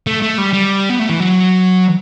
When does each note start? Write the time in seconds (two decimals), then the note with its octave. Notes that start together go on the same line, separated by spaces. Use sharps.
0.07 A3
0.22 A3
0.38 G3
0.53 G3
0.89 B3
0.99 A3
1.09 E3
1.20 F#3